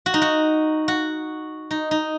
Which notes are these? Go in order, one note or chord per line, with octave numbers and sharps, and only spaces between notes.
F#4
D#4
F#4
F#4
D#4
D#4